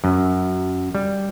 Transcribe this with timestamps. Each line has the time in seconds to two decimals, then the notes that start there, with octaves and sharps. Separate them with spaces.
0.04 F#2
0.95 G3